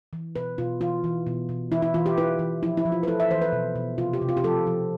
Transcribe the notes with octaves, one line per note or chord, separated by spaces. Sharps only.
E3
B2 B4
B2 F4
E3 F4
E3
B2
B2
E3 E4
E4
E3 F4
G4
E4 B4
E3
F3 E4
E4
F3
F4
B4
E4 A4
E5
E3 C5
B4
B2
B2
C3 F4
G4
C3
F4
G4
F3 A4
F3